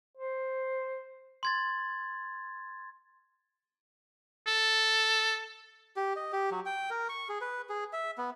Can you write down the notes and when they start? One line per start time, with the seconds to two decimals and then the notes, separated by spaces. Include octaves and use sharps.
0.17 C5
1.43 C6 G#6 A6
4.47 A4
5.96 G4
6.16 D#5
6.33 G4
6.51 F#3
6.66 G5
6.90 A#4
7.09 C#6
7.29 G#4
7.41 B4
7.69 G#4
7.93 E5
8.18 B3